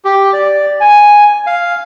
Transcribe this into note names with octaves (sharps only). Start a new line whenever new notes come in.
G4
D5
G#5
F5